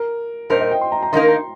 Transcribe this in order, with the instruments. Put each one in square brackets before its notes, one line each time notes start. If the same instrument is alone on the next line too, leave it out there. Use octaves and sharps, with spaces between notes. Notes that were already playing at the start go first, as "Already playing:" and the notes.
Already playing: [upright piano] A#4
[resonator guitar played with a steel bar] A#2 G3 D#4 A#4 [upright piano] C5
[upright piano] D#5
G5
C6
A#5
A#5
[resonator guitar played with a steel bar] D#3 G3 A#3 D#4 A#4 [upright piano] C6
[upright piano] A#5